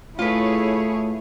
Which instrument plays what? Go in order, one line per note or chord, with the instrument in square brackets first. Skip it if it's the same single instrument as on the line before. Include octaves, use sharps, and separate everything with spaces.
[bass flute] A3 [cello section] E4 G#4 C#5 [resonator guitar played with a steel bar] F4 B4